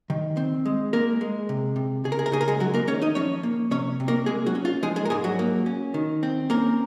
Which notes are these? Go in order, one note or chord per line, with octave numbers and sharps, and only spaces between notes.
D#3
C4
G#3
G#3 A#3 A#4
G#3
C3
C3
C#3 G#4
A#4
G#4
A#4
C#3 G#4
A#4
G#3 G#4
F#3 G#3 F#4
A#3 A#4
D#3 C#4 C#5
D#4 D#5
F3 C#4 C#5
A#3
C3 C#4 C#5
C3
A#3 A#4
G#3 A#3 G#4
F#3 F#4
C#4
F4
F3 G#3 G#4
G#3 G#4
A#4
G#2 G#3 G#4
F#3 F#4
A#3
C#4
D#3
C4
A#3 C#4 A#4